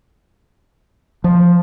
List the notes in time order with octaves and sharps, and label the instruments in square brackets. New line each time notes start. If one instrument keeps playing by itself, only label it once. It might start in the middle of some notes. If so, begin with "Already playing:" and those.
[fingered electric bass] F3